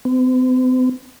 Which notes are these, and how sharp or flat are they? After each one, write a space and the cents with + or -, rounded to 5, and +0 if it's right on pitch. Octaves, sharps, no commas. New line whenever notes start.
C4 -45